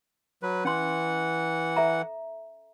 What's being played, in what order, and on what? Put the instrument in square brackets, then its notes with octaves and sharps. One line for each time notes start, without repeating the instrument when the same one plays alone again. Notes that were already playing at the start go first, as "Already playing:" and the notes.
[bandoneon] F#3 B4
[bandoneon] E3 F#5 [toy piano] C#4 C6
[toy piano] A4 E5 A#5